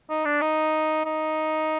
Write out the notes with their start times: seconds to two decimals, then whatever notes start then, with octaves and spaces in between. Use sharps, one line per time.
0.10 D#4
0.25 D4
0.41 D#4
1.05 D#4